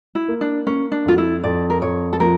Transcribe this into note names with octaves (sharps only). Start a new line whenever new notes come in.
E4
A#3
D4
A#3 C#4
D4
F2 F4
E4
F2 D5
A#4
F2 C#5
A4
F3 A#4